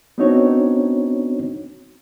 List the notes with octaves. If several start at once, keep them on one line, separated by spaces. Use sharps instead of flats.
B3 C4 D4 D#4 F#4 C#5